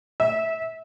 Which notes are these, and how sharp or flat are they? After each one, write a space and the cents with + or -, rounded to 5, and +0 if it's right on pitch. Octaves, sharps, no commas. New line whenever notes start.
E5 -20